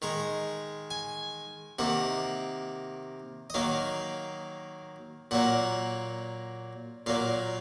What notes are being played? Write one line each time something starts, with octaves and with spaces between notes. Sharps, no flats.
D#3 G#3 A#5
G#5
C3 D#3 A#3 F#5
D#5
D#3 F#3 A#3 F5
A#2 F#3 A#3 F#5
A#2 F#3 A#3 F5